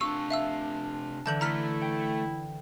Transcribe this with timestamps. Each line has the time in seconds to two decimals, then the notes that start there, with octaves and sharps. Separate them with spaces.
0.01 C3 D4 F4 C#6 E6
0.30 E5 F5 E6
1.26 D3 E3 A5 G6 F#7
1.41 A3 E4 A#5 F6 B6
1.82 G5